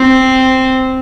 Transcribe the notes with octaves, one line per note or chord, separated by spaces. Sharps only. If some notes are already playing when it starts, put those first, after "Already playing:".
Already playing: C4